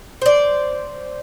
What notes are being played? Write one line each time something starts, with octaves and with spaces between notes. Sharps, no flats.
C5 D5